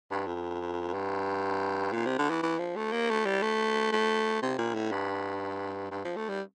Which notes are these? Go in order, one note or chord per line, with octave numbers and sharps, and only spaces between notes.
G2
F2
G2
A#2
C3
D3
E3
E3
F3
A3
A#3
A3
G3
A3
A3
C3
A#2
A2
G2
G2
F3
A3
G3